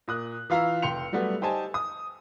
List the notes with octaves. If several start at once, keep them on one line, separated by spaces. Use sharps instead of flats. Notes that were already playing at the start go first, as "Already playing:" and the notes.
A#2 D#6 F#6
E3 F4 F5 A#5 E6
F1 G5 C6 C#7 F7
F#3 G3 A3 B3
D#4 G4 C5 G#5 A5
D#6